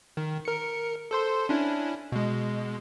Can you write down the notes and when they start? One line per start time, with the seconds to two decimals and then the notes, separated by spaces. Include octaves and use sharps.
0.17 D#3
0.45 A#4 C#7
1.11 A4 C5 C6
1.49 C#4 D4 E4
2.12 B2 G#3